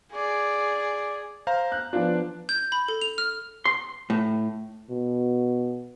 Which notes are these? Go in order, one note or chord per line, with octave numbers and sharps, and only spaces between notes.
G#4 D5
C5 F5 A#5
F#6
F3 B3 D4 F4 D5
G6
B5
A4
F7
F6
C6
A2
B2